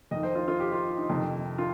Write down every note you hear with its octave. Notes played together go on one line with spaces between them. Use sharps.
F2 D#3 D#5
C5
F4
F4
G4
F4
D#4
F2 C3 D#3
F4